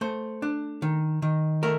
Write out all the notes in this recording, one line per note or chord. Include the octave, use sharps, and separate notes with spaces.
A3 C5
D4
D#3
D#3
A3 A#4